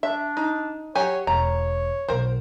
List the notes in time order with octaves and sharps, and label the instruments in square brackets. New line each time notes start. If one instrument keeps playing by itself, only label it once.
[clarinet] D4 [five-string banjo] E5
[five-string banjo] D#4
[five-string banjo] F#3 G4 G#5 [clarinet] C#5
[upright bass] E1 [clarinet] C#5 [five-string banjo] A#5
[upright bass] B1 B2 [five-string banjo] A#4 C5